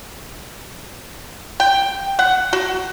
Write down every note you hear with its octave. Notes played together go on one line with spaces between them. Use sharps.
G5
F#5
F#4